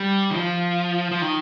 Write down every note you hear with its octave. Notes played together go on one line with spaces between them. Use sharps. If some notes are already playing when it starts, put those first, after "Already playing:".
Already playing: G3
D#3
F3
F3
D#3